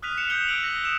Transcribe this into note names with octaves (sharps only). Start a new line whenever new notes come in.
D#6 F6 F#6 B6 D#7 F7
F#6 C#7 E7
D#6 F#6 G6 C#7 F7 G7
E6 D7 F#7
A#6
D#6 E6 E7